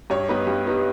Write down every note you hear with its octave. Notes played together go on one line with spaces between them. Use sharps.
G2 C#5
G3 B3 D#4 B4
G2
G3 B3 D#4